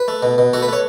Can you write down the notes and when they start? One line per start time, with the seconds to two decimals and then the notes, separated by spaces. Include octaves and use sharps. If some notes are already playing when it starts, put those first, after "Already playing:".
Already playing: B4
0.08 A3
0.23 B2
0.38 B2
0.53 A3 F#4
0.62 B4
0.68 A3 C#5